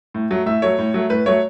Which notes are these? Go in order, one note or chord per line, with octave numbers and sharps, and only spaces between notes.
A2
F#3 A3
A2 E5
F#3 A3 C#5
A2
F#3 A3
A2 B4
F#3 A3 C#5